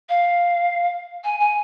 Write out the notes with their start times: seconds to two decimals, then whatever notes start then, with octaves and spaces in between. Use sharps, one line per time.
0.09 F5
1.24 G#5
1.40 G#5